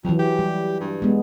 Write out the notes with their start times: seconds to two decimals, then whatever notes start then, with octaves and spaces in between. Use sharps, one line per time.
0.05 F2 E3 F#3
0.19 G4
0.39 G3
0.81 G2
1.02 G#3 B3